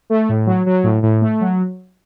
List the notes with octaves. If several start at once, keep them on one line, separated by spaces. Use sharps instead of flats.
A3
A2
F#3
F#3
A2
A2
A3
F#3